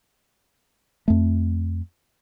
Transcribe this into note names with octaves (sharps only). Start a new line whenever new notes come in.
F2 A3